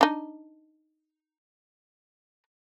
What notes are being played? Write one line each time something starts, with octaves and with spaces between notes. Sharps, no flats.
D4 D#4